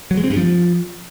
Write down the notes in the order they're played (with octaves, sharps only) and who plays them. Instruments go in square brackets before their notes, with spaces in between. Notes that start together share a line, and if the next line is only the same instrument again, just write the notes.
[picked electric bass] F#3
G#3
C4
G2
F3